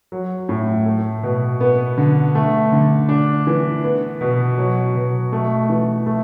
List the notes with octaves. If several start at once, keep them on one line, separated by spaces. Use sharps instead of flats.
F#3
A2
A3
B2
B3
D3
A3
D3
D4
E3
B3
B2
F#3
B2
A3
E3
A3